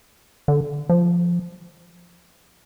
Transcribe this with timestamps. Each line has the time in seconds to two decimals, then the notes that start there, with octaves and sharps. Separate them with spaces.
0.48 D3
0.89 F3